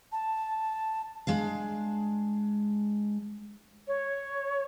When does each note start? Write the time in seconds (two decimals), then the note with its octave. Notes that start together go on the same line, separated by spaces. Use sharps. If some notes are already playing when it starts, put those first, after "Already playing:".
0.12 A5
1.27 G#3 D4 F5
3.87 C#5